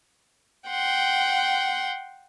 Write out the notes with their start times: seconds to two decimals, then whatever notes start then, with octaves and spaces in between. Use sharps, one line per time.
0.69 F#5 G5 C6